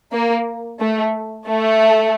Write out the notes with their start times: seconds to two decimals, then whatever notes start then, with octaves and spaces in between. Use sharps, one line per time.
0.12 A#3
0.80 A3
1.49 A3